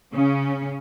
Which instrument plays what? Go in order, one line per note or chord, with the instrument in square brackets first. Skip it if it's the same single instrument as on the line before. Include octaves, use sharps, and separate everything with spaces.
[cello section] C#3 C#4